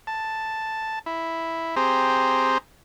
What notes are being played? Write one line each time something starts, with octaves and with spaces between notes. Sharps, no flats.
A5
E4
C4 G4 G#4 C5 A#5